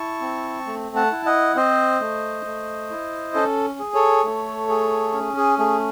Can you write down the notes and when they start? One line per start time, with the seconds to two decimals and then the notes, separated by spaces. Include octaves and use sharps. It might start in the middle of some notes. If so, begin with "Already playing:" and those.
Already playing: E4 A5 C#6
0.21 C4
0.66 A3
0.96 F#5 A5
1.11 E4
1.26 D#5 F#5
1.55 C4 C5 D#5
2.00 A3
2.46 A3
2.90 E4
3.34 C#4 A4
3.79 G#4
3.94 A4 C#5
4.24 A3
4.69 G#4
5.13 C#4
5.37 G#4
5.58 A3 G#4